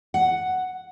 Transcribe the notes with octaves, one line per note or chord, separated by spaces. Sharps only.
F#5